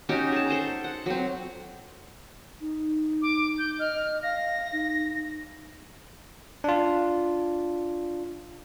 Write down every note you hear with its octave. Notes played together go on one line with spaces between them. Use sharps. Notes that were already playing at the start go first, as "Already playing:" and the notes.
C#4 D#4 F#4 G4
G#4 A5
A4 C5 A5 A#5
F#5
F#3 C4
D#4
D6
G6
D#5 F6
F5 A#6
D#4
D4 F4